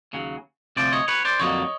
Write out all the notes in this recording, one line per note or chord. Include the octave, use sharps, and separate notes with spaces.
D#2 C#3 F#3
D2 C3 F3 C5 D5
C#5 D#5
B4 C#5
C5 D5
F2 D3 F#3 A#3 C#5 D#5